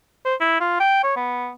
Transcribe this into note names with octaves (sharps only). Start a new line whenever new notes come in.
C5
E4
F4
G5
C#5
B3